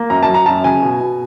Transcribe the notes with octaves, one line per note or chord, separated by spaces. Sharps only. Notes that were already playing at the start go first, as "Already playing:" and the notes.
Already playing: A#3
F#2 A#5
A5
F#3
A#5
F#2 A5
C#3 G#5
B2
B2